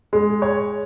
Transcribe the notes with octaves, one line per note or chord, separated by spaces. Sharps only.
G#3
C#5